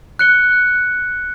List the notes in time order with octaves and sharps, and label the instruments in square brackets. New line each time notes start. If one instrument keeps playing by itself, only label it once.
[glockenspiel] F#6 C#7 G7